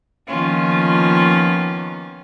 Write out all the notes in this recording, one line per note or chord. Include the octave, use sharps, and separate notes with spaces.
D#3 F3 A#3 B3 C#4 F4